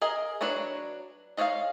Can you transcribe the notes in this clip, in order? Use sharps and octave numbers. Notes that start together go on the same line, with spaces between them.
G#4 A#4 D#5 G#5
F#3 D4 B4 C#5 A#5
D#4 G#4 C#5 D5 F5